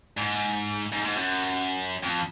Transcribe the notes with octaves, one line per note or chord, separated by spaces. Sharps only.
G#2
G#2
G#2
F#2
F2